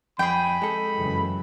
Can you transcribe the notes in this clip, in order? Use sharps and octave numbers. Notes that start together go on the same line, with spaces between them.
F2 G#4 G5 B5
G#3 A4
F#2 C#3 E3